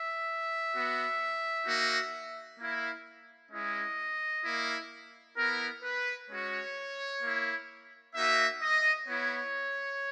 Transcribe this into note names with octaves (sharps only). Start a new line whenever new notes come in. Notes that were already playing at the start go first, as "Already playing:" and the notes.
Already playing: E5
B3 F#4
A#3 D#4 F#4
A#3 E4
G#3 C#4 E4 D#5
A#3 E4
B3 E4 A#4
B4
G#3 C#4 F#4 C#5
A#3 E4
A#3 D#4 F#4 E5
D#5
B3 E4 C#5